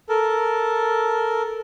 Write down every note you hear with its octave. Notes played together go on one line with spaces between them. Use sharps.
A4 A#4